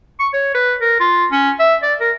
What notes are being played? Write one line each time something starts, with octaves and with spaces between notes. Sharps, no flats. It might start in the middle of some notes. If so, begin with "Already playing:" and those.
C#6
C#5
B4
A#4
F4
C#4
E5
D5
A#4